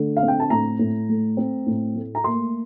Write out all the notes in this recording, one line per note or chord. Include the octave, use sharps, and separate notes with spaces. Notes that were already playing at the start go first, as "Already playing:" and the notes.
Already playing: D3 A3
F5
C4
G5
A5
A2 A#5
A2
A3
C4
A2
A3
A#5
A#3 C6